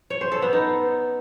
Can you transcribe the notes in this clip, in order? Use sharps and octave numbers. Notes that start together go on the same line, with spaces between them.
C#5
C5
A4
B3
D#4